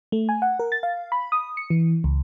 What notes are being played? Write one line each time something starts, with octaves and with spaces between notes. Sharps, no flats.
A3
G#5
F#5
A#4
A6
F5
B5
D#6
C#7
E3
C#2